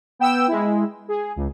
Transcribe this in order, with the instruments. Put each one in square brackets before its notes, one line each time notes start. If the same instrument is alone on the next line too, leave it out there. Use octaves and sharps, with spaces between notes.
[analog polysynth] B3 G5 E6
G#3 E4
G#4
C#2